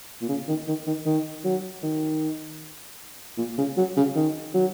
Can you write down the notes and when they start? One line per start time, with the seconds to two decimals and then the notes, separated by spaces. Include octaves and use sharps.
0.22 A#2
0.29 C#3
0.48 D#3
0.68 D#3
0.87 D#3
1.06 D#3
1.44 F#3
1.83 D#3
3.38 A#2
3.58 C#3
3.77 F#3
3.97 C#3
4.16 D#3
4.54 F#3